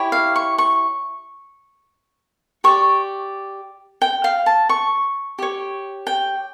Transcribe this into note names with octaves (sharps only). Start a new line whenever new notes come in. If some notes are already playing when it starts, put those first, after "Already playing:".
Already playing: E4 G4 C#5
F5
C#6
C#6
G4 D5 C#6
G5
F5
A5
C#6
G4 C#5
G5